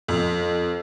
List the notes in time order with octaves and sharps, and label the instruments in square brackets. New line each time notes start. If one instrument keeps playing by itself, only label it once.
[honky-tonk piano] F2